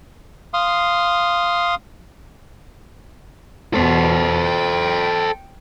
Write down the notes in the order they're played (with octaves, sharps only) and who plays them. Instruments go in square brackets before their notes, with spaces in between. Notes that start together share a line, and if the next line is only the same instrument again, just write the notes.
[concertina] F5 C6 D#6
[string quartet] E2 B2 [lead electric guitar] A4 C5
[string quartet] G5